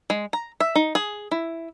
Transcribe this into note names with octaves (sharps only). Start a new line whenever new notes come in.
G#3
A#5
E5
D#4
G#4
E4